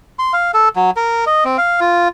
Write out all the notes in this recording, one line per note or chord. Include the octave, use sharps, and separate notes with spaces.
C6
F5
A4
F#3
A#4
D#5
C4
F5
F4